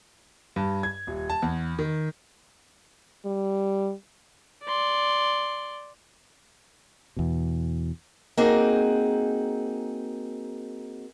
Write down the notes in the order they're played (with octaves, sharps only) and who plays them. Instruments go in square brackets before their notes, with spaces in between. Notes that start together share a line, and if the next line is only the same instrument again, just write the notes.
[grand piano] G2
G#6
D#1
A5
E2
D#3
[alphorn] G3
[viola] D5 C6
[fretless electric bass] E2 B2
[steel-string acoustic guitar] A#3 C4 D#4 F#4 G#4